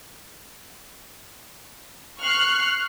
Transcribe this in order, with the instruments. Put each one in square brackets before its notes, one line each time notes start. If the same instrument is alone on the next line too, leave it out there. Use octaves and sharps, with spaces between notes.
[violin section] C#6 F6 F#6 C7